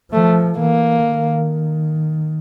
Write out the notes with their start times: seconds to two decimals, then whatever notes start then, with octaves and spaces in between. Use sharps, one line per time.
0.12 F3 A3
0.59 E3 A#3
1.07 D#3